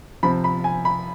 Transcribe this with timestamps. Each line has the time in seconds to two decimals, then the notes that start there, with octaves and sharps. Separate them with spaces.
0.23 C3 F3 B5
0.44 B5
0.64 G#5
0.85 B5